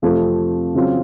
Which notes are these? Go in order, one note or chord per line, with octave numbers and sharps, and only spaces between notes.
F2 C3 F3 A3
C#3 F#3 C4 F4